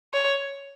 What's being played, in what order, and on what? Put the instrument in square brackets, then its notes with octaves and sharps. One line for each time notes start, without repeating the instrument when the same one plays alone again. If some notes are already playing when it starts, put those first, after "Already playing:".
[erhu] C#5